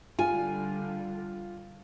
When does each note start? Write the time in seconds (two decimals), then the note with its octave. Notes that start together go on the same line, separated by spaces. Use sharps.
0.19 D3 G3 F4 G#5